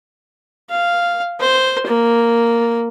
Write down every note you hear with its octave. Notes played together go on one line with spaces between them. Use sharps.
F5
C5
A#3